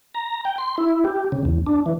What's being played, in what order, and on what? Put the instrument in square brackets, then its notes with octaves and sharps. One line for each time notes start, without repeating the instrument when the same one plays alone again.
[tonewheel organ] A#5
G5
C6
E4
G4
C#3
E2
D4
E3